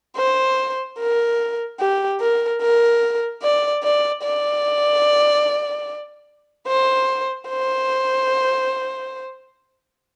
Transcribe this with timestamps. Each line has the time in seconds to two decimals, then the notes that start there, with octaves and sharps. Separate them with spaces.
0.17 C5
0.99 A#4
1.80 G4
2.20 A#4
2.61 A#4
3.42 D5
3.83 D5
4.23 D5
6.67 C5
7.49 C5